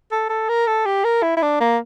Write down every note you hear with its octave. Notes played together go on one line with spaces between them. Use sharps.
A4
A4
A#4
A4
G4
A#4
E4
E4
D4
A#3